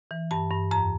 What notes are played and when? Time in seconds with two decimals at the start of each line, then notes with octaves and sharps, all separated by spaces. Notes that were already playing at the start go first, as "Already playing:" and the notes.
0.11 E3
0.31 G2 A5
0.51 G2
0.71 F2 A#5